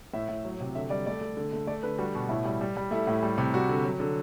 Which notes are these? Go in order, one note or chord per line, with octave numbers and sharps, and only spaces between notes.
A2 E5
A2
F#3
C3
D3 E5
G3 D5
A3 D5
A3
D3
A3
A3 D5
D3 B4
G3 F#4
B2 F#4
A2 E4
G3
G3
G3
A3 E4
A2
G3
C3
G3 F#4
D3
F#3
D3